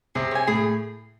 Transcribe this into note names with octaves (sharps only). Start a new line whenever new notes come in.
C3 G#4
C#5 G#5
A2 G#4